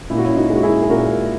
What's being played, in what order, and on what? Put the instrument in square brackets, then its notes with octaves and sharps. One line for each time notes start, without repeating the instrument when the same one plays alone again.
[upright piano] A#2 E4
F#4
C#4 E4
D#4 F#4
G#3
F#4
E4 G#4
G#4
A#2 F#4 A#4